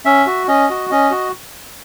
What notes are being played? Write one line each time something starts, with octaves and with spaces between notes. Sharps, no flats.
C#4 E5
F#4
C#4 D#5
F#4
C#4 D#5
F#4